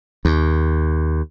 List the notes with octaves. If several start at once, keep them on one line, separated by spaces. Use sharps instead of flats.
D#2